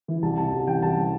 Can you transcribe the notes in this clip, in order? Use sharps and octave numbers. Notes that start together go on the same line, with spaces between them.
E3
C2 A5
C3 A5
C2
E3 G5
C2 A5